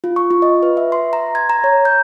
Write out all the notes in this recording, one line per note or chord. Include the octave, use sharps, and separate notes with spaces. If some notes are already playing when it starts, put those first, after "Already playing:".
F4
C#6
F4
D#5
B4
E5
C6
A#5
G#6
A#5
C#5
G6